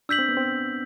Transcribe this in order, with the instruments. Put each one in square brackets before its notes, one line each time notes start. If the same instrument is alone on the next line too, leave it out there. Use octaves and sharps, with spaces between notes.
[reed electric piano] D4 [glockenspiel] E6 G6 B6 F#7
[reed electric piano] C4
B3
C4